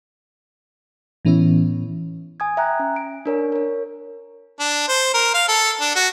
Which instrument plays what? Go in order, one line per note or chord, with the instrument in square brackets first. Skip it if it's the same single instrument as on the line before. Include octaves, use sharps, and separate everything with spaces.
[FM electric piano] A2 E3 B3 C#4 E4
[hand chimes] G#5 D#6 G#6
E5 G5 A#5 F#6
C#4
D7
D4 A#4 C#5
A#4 C#5
[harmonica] D4
C5
A#4
F5
A4
D4
F#4